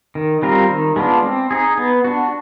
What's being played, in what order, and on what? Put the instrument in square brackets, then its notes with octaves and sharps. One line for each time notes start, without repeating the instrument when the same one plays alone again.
[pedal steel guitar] D#3
G3 C4 F4 A#4
D#3
G#3 B3 D4 F4
C4
D#4 G#4
B3
D4 F#4